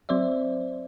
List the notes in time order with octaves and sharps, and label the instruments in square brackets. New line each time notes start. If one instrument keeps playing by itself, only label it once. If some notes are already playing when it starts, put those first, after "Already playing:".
[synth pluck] F#3 C4 C5 D5 E5